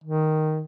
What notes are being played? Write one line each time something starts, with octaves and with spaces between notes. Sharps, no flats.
D#3